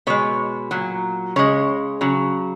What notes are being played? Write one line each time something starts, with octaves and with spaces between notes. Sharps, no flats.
B2 G#3 C#5
A#2 F#3
C#3 G#3 C#5
C#3 F#3